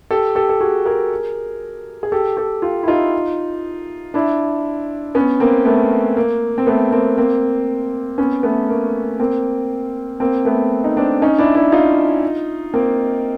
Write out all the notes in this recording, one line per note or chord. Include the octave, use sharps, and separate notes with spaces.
G4 A4
G4 A4
A4
F#4 G#4
G#4 A#4
G#4
G4 A4
G4 A4
F4 G4
E4
D#4 F4
D4 E4
B3 C#4
A#3 C4
A3 B3
A#3
C4
A3 B3
A#3 C4
A#3 C4
B3 C#4
A3 B3
A#3
A#3 C4
A#3 C4
A3 B3
D#4
C4 D4
C#4 D#4
D4 E4
D4 E4
D#4 F4
A#3 C4